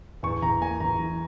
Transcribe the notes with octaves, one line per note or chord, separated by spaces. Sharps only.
E2 C#6
E2 A#5
A#3 G#5
E2 A#5
E3